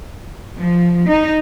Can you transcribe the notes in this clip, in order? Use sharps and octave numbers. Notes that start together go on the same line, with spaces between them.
F3
D#4